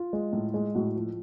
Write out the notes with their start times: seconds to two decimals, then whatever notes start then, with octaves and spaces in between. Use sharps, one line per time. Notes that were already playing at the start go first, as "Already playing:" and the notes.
Already playing: F4
0.13 G#3
0.33 A2
0.54 G#3
0.75 A2 F#4
0.96 F3